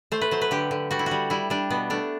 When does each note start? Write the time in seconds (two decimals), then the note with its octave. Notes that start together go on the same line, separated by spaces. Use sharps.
0.12 A3 C5
0.21 B4
0.31 F#3 C5
0.42 B4
0.51 D3 G4
0.71 D3
0.91 G3 F#4
0.99 E4
1.06 F#4
1.11 G3
1.30 G3 E4
1.50 G3 D4
1.70 B2 B3
1.90 A3 D4